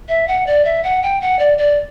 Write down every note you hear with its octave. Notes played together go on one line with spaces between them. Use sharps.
E5
F#5
D5
E5
F#5
G5
F#5
D5
D5